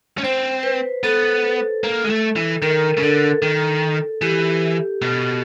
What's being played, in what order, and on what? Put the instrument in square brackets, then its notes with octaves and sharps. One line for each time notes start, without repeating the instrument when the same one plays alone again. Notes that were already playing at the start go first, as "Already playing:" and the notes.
[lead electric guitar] C#4
[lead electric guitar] C4 [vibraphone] C5
[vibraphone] B4
[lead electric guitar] B3 [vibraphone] A4
[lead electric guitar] A#3
G#3
A3
E3
[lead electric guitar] D#3 [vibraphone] A#4
[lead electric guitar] C#3
[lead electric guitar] D3 [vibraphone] A4
[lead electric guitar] D#3
[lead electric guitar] E3 [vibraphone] G4
[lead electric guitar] B2